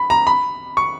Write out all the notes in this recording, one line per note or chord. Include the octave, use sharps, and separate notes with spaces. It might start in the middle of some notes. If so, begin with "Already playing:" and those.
Already playing: B5
A#5
B5
C#6